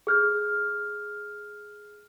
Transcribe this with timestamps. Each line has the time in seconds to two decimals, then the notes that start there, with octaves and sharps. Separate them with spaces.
0.07 G#4 F6 G6